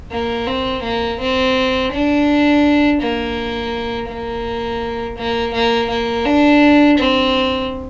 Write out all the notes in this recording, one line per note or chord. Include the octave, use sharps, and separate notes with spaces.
A#3
C4
A#3
C4
D4
A#3
A#3
A#3
A#3
A#3
D4
C4